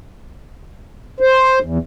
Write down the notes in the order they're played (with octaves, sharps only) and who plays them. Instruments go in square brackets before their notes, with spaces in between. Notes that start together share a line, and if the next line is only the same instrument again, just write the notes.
[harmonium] C5
E2